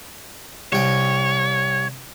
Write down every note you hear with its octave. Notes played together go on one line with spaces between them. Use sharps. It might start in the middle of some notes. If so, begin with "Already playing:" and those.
C2 C#5 G5